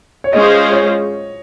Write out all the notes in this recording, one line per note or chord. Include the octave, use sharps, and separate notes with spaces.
C#5
G#3 C#4 F4 G#4 C5 D#5
C#5